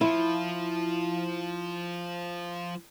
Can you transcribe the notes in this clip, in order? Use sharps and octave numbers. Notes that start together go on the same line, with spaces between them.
F3 E4 F4